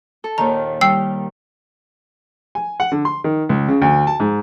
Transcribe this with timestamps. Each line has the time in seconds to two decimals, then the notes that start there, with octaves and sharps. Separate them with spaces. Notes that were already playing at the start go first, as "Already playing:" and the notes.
0.24 A4
0.38 D#2 A#2 D#3 A#5
0.81 D#3 G3 D#4 G5 E6 C7
2.55 G#5
2.80 F#5
2.92 D3
3.05 C6
3.24 D#3
3.49 C#2
3.68 C#3
3.82 D2
4.07 A5
4.20 G#2